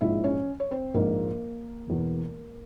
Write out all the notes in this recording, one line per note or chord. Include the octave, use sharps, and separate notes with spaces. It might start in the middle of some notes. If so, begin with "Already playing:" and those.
A#1 G#2 F3 G#3 E4 E5
C#4 C#5
C#5
C4 C5
A#1 G#2 F3 G#3 A#3 A#4
E1 E2 E3